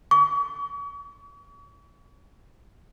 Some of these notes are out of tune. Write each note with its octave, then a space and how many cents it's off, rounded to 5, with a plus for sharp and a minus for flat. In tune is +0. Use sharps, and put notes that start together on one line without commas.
C#6 +40